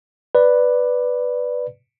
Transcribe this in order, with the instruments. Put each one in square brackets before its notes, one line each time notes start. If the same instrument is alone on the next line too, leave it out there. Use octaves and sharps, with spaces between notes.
[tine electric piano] B4 D5